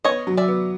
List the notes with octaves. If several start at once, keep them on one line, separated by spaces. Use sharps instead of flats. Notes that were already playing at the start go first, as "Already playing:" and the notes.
B3 C#5 D#5
F#3
D5 E5
B3